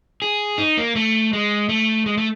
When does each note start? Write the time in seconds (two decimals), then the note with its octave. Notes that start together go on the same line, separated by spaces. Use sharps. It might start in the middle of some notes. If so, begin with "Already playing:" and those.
0.22 G#4
0.58 D#4
0.77 A#3
0.96 A3
1.33 G#3
1.69 A3
2.06 G#3
2.17 A3